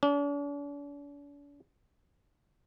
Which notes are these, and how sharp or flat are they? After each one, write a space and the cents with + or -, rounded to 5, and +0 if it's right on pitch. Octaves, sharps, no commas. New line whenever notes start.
D4 -45